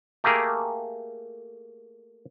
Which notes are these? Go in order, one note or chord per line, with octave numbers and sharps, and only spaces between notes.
A3 A#3 G4 G#4 A#4